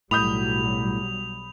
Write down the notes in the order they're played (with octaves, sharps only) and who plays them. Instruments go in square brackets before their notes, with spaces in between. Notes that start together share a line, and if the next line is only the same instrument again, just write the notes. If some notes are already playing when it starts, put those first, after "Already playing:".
[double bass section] B1 F#3 G3 [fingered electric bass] A2 [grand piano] B5 D#6 G6 [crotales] F7